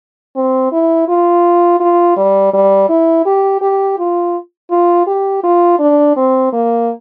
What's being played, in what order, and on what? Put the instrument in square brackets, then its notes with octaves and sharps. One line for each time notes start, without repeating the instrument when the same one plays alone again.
[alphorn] C4
E4
F4
F4
G3
G3
E4
G4
G4
F4
F4
G4
F4
D4
C4
A#3